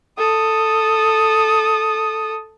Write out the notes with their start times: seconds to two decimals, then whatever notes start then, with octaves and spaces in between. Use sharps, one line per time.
0.18 A4 D#6